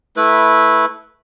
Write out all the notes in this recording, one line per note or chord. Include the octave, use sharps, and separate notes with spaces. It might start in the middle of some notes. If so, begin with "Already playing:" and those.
A3 E4 B4